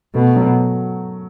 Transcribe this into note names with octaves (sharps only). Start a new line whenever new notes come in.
B2 A3
F#3